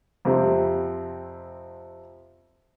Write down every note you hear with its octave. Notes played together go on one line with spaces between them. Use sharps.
F2 C3